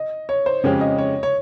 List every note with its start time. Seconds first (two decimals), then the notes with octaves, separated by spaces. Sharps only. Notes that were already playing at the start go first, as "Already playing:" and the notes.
Already playing: D#5
0.29 C#5
0.46 C5
0.64 F2 C#3 G#3 C#4 G4 C#5
0.81 D#5
0.98 C#5
1.23 C#5